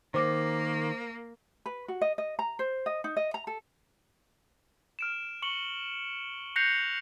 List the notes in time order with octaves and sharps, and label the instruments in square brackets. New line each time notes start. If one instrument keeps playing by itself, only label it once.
[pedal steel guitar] D#3 [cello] A#3 [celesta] C5 D6
[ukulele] B4
F#4
D#5
D#5
A#5
C5
D#5
D#4
D#5
A#5
A4
[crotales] F6 D7 E7
C#6 C#7 F#7 G7
F#6 G6 A#6 C7 C#7 F7